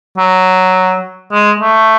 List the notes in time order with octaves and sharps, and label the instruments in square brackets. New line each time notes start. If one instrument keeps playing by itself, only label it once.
[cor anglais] F#3
G#3
A3